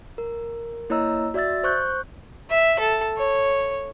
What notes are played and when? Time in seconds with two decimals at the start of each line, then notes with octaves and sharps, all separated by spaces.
0.18 A#4
0.90 A#3 E4 C#5 D#5 A#5 E6
1.34 F#4 D5 E5 E6 A6
1.64 C5 C#6 F#6 G6
2.50 E5
2.79 A4
3.17 C#5